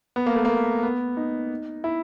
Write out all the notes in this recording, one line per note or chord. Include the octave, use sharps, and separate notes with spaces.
B3
A#3
A3
A#3
B3
D#4
E4